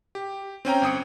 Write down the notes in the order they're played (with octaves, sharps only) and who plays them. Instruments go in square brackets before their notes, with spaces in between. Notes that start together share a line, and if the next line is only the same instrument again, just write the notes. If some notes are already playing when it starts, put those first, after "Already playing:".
[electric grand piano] G4
C4 C#4 G5 A#5
G1 C4 D#6 C#7